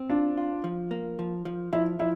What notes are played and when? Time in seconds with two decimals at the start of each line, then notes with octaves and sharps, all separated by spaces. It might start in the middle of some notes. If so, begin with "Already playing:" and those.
Already playing: C4
0.10 D4 F4
0.37 F4
0.64 F3
0.91 A#3
1.19 F3
1.45 F3
1.73 F3 E4
1.99 F3 E4